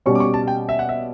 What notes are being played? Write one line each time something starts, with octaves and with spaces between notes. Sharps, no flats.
B2 G3 C#4 C#6
D6
C#6
A5
G5
E5
F#5
E5